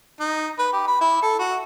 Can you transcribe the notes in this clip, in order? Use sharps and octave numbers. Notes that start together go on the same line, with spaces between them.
D#4
B4
G4
B5
E4
A4
F#4